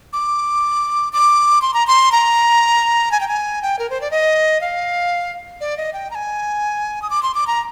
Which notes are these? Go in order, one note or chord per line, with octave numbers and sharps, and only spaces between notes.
D6
D6
C6
A#5
C6
A#5
G#5
G5
G#5
G5
A#4
C5
D5
D#5
F5
D5
D#5
G5
A#5
G#5
D#6
D6
C6
D6
A#5